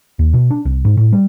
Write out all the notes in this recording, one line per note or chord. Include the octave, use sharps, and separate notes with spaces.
D#2
B2
D4
C2
G#2
A2
G3